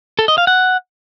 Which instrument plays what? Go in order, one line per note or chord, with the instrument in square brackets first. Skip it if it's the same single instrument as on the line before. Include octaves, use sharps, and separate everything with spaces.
[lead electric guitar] A4
D#5
F5
F#5